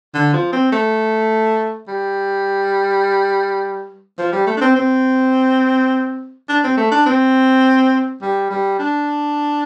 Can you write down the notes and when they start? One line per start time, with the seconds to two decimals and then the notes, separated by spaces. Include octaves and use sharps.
0.14 D3
0.33 F3
0.53 C4
0.72 A3
1.88 G3
4.18 F3
4.32 G3
4.46 A3
4.57 D4
4.61 C4
4.76 C4
6.49 D4
6.64 C4
6.77 A3
6.91 D4
7.06 C4
8.22 G3
8.50 G3
8.79 D4